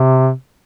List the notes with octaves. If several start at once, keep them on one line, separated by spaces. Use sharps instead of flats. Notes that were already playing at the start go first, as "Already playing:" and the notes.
Already playing: C3